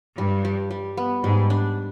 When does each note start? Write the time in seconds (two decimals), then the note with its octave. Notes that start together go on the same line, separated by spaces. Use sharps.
0.18 G2 G3
0.45 G3
0.71 G3
0.97 B3
1.24 G#2 G3
1.50 D4